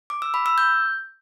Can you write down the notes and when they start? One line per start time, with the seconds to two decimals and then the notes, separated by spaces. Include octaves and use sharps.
0.10 D6
0.22 E6
0.34 B5
0.46 E6
0.58 G6